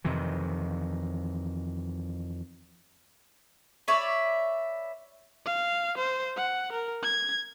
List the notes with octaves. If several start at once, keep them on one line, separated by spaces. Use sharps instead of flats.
F2 C3 D#3 E3
B4 C#5 D5 E5
F5
C5
F#5
A#4
G#6